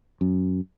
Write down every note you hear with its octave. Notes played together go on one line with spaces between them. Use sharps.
F#2